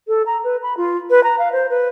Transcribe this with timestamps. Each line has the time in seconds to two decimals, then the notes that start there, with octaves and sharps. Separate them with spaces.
0.08 A4
0.26 A#5
0.44 B4
0.63 B5
0.77 F4
1.10 B4
1.24 A#5
1.39 F5
1.53 C5
1.70 B4